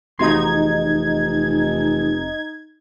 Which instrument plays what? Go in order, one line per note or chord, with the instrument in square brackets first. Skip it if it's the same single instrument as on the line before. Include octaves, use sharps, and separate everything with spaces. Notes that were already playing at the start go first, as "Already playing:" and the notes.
[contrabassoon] F1 [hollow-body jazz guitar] E2 F#4 C6 [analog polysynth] D#4 G#6